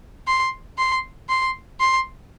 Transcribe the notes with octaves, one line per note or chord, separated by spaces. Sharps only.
C6
C6
C6
C6